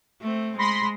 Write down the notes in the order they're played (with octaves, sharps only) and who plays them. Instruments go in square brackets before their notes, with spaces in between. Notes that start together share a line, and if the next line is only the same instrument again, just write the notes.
[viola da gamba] A3 C4
[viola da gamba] G#3 [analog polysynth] B5 C6 A#6